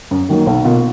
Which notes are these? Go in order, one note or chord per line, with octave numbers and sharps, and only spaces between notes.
F#2
D#3 F#3 A#3
B1
B2 A#3 F4